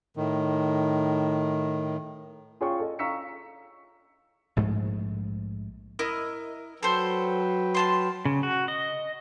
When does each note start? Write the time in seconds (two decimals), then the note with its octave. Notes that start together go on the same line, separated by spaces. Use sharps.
0.17 A2 D#3
2.61 F4 G#4 C#5 F5 G5 C#6
2.79 A4 D#5
2.99 F5 A#5 C#6 E6 B6 C#7
4.57 A#1 G#2 G#3 A3
5.99 E4 A#4 D#5
6.83 F#3 A4 B4 C5 G5
7.75 F4 A5 C6
8.25 C#3
8.43 F#4
8.68 D#5